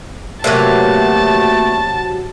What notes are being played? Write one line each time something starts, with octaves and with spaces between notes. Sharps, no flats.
E2 C3 F#3 A3 A#3 B4 A5